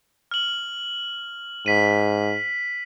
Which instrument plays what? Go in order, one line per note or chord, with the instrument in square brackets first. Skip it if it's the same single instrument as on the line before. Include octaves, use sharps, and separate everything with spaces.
[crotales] F6 F#7
[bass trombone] G#2 [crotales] B6 D#7